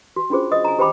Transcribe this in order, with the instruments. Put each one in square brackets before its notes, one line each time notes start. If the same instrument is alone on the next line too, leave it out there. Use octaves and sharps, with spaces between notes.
[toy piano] F#4
C#4 D4 F4 G#4 C5
D#5 D#6
G#5 A#5
G4 C5 G5 B5 D6